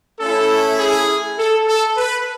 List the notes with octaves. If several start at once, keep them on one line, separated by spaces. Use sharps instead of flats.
A3 C#4 E4 A4
G#4
A4
A4
B4